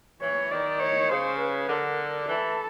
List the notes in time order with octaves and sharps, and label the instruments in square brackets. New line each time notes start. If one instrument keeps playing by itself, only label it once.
[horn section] E3 [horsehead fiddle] C#5
[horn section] D#3 [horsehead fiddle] D5
[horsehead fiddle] C#5
[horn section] C#3 [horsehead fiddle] C5
[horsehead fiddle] B4
[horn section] D3 [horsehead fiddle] A#4
[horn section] E3 [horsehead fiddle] A4